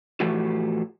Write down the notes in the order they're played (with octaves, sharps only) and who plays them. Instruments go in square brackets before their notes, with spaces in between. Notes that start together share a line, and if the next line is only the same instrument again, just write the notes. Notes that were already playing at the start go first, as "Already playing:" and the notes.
[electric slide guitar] A2 E3 F3 A3 F#4 G4